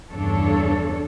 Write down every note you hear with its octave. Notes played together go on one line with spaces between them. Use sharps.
E2 G2 C#3 D4 A4 C#5